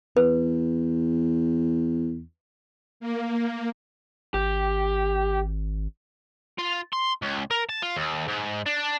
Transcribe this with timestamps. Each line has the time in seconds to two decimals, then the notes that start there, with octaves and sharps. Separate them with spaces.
0.17 E2 B4
3.00 A#3
4.34 G#1 G4
6.59 F4
6.93 C6
7.22 C#2
7.51 A#4
7.69 A5
7.82 F4
7.96 D#2
8.28 G#2
8.66 D4